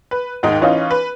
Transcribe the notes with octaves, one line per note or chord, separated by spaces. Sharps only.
B4
D#2 G#2 D#4
E3 C#4 D#4 F4
B4